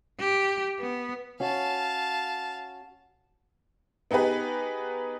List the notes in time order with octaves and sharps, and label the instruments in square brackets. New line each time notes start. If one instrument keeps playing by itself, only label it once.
[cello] G4
B3
[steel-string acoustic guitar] C#4 F#4 [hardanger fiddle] F5 A5
[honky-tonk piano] B3 D#4 G4 G#4 B4